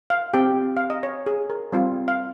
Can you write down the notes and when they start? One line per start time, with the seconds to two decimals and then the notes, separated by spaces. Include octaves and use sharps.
0.10 F5
0.34 C4 G4 G5
0.77 F5
0.90 D#5
1.03 C#5
1.26 G#4
1.50 A#4
1.72 G3 C4 F4
2.08 F5